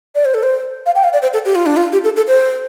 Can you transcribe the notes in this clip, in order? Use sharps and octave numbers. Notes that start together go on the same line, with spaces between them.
D5
C5
A4
C5
F5
G5
F5
D5
C5
A4
G4
F4
D4
F4
G4
A4
A4
C5